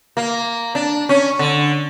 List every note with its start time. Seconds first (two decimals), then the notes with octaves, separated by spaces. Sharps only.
0.17 A#3
0.75 D4
1.09 C#4
1.39 D3